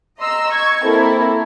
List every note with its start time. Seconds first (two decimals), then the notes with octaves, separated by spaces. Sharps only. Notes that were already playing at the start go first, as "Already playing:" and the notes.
0.19 D#5 A#5 C6 E6
0.50 C#6 G#6
0.83 A#3 C4 E4 A4 A#4